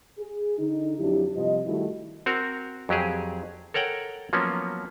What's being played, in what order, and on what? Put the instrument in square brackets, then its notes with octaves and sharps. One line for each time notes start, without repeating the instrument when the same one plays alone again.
[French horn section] G#4
D3 D#4
F2 F#3 D4 E4 G4
G2 C3 F3 D#5
D#3 G3 A3 D#4 E4 F#4
[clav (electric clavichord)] C4 F#4 A#4
F2 F#3 G4 G#4
A4 A#4 C#5 F#5 G5
F3 F#3 A#3 B3 C#4